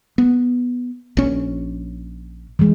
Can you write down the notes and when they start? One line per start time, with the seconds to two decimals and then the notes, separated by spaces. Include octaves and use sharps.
0.18 B3
1.17 A#1 C#4
2.59 E3 G#3